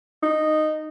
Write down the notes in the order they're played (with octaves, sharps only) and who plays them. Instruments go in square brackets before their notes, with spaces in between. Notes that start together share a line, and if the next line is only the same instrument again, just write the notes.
[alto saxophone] D#4